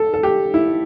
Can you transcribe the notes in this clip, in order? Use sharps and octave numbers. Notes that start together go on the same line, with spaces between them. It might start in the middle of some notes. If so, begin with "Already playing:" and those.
Already playing: A4
A4
G4
E4